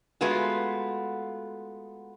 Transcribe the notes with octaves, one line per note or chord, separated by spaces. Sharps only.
G#3 A3 B3 F4 F#4